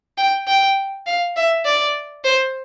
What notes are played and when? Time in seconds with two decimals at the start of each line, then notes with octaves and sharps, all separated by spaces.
0.18 G5
0.47 G5
1.07 F5
1.37 E5
1.66 D5
2.24 C5